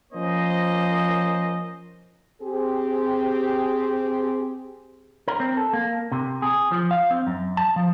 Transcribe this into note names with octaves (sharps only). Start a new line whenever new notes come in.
F3 A#3 C#4 C5 D#5
C4 G4 G#4
A#4
C4
A4
A#3
C3
G#4
F3
F5
C4
F#2
A5
F3